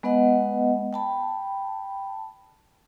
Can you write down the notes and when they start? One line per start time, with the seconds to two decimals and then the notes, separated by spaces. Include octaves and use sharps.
0.03 G#3 B3 B4 D#5 F#5
0.93 G5 A5 B5